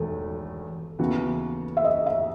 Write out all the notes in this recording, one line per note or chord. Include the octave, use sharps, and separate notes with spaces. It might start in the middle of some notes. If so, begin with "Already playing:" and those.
Already playing: E1 E2 D#3 A3 A4
D#2 C#3 E3 B3 F#4
E5
D#5
E5